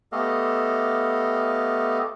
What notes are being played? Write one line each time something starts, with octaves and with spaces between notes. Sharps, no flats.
A3 B3 G4 A4 D#5 F5